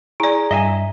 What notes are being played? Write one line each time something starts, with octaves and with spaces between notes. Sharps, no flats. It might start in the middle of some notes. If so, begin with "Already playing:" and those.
E4 G#4 D5 G#5 A#5
G2 D#5 E5 G#5